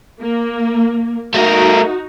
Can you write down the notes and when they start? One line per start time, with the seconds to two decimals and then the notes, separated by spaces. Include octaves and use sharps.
0.20 A#3
1.34 A3 D#4 F#4 A#4